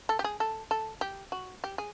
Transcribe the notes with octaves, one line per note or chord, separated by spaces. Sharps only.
A4
G4
G#4
A4
A4
G4
F#4
G4
G#4